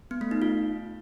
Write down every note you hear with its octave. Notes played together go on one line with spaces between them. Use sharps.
B3
A3
D#4
F4